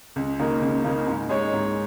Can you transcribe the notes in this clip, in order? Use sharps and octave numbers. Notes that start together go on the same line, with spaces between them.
C#2
C#3 A#3 D#4
C#2
C#3 A#3 D#4
G#2
G#3 D#4 C#5
G#2